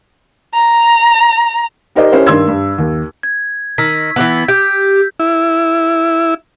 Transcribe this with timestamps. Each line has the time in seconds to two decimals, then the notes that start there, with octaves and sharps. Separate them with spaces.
0.54 A#5
1.95 D#4 G4 A#4 C5 D5 D#5
2.12 C#4 E4 G4 A#4 C5
2.26 G2 D#3 D4 C6 E6 G#6
2.47 G2
2.78 D#2
3.23 G#6
3.78 D#3 E6 B6
4.16 E3 G3 B3
4.48 G4 G6
5.20 E4